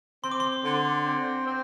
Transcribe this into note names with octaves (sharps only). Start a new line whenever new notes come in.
C4 C6
D6
C6
D3
C4
C4